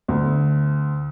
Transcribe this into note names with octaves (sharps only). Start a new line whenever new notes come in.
D2